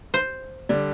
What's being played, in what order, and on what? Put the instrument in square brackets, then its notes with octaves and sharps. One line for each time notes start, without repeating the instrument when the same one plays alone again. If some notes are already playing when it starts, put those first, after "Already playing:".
[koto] C5
[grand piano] D3 G3 [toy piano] D5